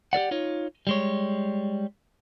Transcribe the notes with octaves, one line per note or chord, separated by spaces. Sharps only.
G4 A#4 D5 F#5
D#4 F4 C#5
G3 G#3 C#5